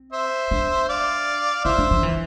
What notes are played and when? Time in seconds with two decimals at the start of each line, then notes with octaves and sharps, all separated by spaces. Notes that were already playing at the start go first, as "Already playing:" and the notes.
Already playing: C4
0.12 C5 E5
0.51 D4
0.89 D5 F5
1.65 E4 C5 E5
1.78 D4
1.91 F3
2.03 E3